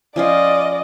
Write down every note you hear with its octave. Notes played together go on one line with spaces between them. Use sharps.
F3 C#4 F4 D5 D#5